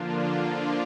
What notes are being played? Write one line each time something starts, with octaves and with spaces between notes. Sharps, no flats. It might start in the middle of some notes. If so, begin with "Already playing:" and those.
Already playing: D3 F3 A#3 D4 F4